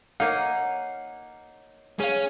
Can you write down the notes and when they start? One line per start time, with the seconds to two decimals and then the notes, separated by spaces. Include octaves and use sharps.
0.20 A#3 D#4 C#5 D#5 F5 F#5
2.00 C#4 G#4 F5